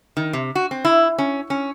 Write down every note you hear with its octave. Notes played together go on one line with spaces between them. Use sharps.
D#3
C3
F#4
C4
E4
C#4
C#4